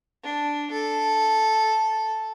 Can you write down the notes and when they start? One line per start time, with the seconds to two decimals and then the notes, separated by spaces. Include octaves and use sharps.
0.23 D4
0.71 A4